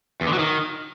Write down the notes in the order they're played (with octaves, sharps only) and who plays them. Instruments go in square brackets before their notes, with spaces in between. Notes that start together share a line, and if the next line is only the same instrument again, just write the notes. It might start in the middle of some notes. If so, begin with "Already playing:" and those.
[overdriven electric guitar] E2
D3
F#3
D#3